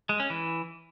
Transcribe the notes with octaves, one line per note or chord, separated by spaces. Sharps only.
G#3
C#4
E3